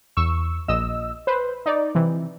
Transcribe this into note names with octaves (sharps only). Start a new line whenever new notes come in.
E2 C#6 E6
A#1 D#5 E6
B4 C5
D#4 D5
C3 E3